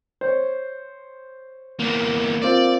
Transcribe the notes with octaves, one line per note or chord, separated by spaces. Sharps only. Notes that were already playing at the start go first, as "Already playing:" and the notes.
C5 C#5
E2 A#3
A#3 C4 F4 D5